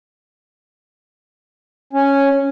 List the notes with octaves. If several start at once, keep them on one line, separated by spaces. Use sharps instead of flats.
C#4